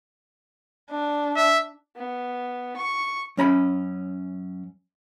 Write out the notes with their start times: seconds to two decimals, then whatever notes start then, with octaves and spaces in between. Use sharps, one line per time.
0.91 D4
1.36 E5
1.97 B3
2.77 C#6
3.37 F#2 C#4 A#5 B5